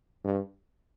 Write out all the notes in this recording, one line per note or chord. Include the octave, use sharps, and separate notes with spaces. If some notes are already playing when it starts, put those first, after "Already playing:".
G2